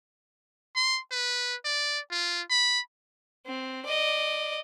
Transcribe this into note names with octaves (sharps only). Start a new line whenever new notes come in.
C6
B4
D5
F4
B5
C4
D5 D#5